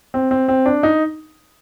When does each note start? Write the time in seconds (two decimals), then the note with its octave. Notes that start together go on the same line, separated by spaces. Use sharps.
0.14 C4
0.31 C4
0.48 C4
0.66 D4
0.83 D#4